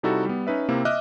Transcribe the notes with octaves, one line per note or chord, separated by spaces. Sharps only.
C3 G3 D#4 E4 F#4 A4
G3 B3
C#4 D#4 B4 E5
C3 A#3 C4 E4
D#5 E5 D6 F6 F#6